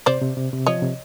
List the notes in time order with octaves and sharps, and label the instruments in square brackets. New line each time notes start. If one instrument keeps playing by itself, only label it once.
[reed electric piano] C3 [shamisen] C5 D5
[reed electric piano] C3
C3
C3
[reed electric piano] F3 [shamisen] C#5 D#5
[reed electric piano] C3